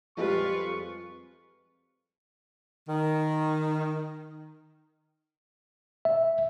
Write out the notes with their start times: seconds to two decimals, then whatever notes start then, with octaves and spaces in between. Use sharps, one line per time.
0.17 F2 F3 G3 G#3 F4 B4 C#6
2.87 D#3
6.05 E5